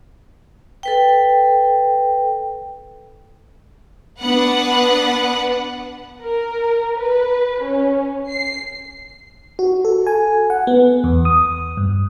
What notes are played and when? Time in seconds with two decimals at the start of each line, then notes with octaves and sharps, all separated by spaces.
0.83 A4 B4 G5
4.20 B3 D4 B4 F#5
6.23 A#4
6.99 B4
7.62 C#4
8.30 C7
9.59 F#4
9.85 A4
10.07 G#5
10.50 F#5
10.67 B3
11.04 E2
11.25 D#6
11.77 G2